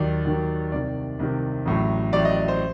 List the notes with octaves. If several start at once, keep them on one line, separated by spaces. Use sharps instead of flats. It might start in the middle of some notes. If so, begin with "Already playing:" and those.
Already playing: D#2 D#3 F#3 D5
D#2 D#3 F#3
C2 C3 D#3 D5
C2 C3 D#3
A1 A2 F#3
A1 A2 F#3 D5
D#5
D5
C5